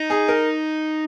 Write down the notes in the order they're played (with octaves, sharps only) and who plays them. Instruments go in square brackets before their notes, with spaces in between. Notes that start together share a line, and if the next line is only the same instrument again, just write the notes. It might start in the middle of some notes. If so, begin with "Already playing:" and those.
Already playing: [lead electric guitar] D#4
[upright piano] G#4
A#4